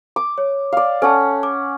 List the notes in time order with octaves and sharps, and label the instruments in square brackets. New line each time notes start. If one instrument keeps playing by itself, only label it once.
[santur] D6
[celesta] C#5
[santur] D5 F5
[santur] C#4 F#5 [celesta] A4 A5
[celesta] D6